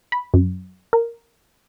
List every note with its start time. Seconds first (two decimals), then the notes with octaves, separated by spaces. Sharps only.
0.12 B5
0.34 F#2
0.93 A#4